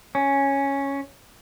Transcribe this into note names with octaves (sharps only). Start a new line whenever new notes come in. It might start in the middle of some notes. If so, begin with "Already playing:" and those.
C#4